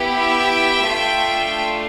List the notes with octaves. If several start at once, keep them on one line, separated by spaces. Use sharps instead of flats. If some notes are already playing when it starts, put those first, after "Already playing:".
Already playing: B3 E4 G4
E5 G5
A3 D4 F4 A4